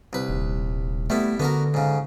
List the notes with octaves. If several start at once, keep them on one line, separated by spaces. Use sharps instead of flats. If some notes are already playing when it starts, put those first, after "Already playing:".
C2 B4
D#1
G3 A3 B3 E4
D3 B3 F#4 A#4
G#2 C#3